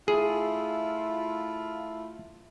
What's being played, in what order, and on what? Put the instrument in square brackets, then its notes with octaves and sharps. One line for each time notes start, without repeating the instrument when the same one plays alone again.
[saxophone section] A3 E4 F4 [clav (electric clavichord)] G#4